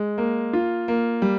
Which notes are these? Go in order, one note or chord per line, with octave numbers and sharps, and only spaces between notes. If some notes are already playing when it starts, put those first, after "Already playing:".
Already playing: G#3
A#3
F4
A#3
G3